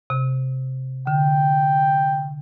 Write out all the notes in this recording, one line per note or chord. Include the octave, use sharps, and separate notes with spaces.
C3
D3 G5